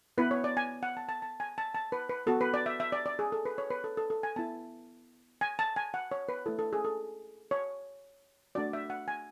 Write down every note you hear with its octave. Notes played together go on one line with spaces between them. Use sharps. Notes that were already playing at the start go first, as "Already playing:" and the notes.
B3 E4 B4
C#5
D5
G#5
F#5
A5
A5
A5
G#5
A5
A5
B4
B4
B3 F#4 A4
B4
D5
E5
E5
D5
D5
G#4
A4
B4
C#5
B4
A4
A4
A4
G#5
B3 E4 A5
G#5
A5
G#5
F#5
C#5
B4
A3 E4 A4
A4
G#4
A4
C#5
A3 D4 F#4 D5
E5
F#5
G#5